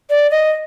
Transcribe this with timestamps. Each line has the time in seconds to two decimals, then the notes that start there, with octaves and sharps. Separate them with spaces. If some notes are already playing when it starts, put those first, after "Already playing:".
0.10 D5
0.31 D#5